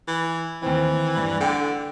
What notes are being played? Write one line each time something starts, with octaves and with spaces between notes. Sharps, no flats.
E3
D#2 E3 C4
G2
D3 F#5 G5